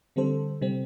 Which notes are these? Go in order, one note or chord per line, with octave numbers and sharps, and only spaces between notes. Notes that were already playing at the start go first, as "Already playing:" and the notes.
D3 G3 C4 A4 C5
C3 G3 C4